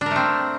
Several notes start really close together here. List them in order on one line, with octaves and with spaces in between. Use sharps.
D4 A#4 A3 C4